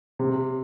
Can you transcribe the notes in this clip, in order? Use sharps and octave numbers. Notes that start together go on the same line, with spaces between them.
C3